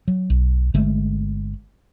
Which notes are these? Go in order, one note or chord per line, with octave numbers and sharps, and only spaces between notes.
F#3
B1
G1 D3 G#3 A3